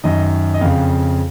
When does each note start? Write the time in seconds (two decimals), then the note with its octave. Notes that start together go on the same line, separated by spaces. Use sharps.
0.04 F#2 D#3 D#5
0.54 D#5
0.61 F2 C#3 F5